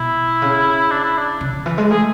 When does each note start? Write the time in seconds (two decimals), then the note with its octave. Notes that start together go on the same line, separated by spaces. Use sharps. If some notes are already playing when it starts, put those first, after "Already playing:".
Already playing: B2 E4
0.42 C#3
0.91 D4
1.04 E4
1.18 D4
1.41 C#3
1.53 C#3
1.66 E3
1.78 G#3
1.90 A3 G#4